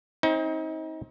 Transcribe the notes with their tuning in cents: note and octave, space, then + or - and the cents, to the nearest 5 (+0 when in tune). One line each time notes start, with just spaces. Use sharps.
C4 +30 D#4 +35